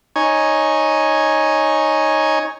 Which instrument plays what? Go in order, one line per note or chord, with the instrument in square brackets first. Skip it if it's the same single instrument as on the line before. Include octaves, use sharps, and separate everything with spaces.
[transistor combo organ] D#4 C#5 G#5